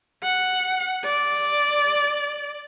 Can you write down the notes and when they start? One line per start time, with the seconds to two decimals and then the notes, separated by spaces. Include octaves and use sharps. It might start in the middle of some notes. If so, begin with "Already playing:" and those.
0.23 F#5
1.04 D5